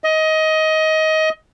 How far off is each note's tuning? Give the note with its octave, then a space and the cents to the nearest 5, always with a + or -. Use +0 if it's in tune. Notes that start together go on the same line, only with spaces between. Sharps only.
D#5 +20